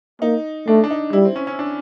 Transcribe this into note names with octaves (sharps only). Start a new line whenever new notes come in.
A#3 D#4
A3 D4
D4
D#4
G3 E4
C4
C#4
C#4
D4